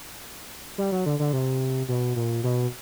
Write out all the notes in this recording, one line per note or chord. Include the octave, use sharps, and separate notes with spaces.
G3
F#3
D3
D3
C3
B2
A#2
B2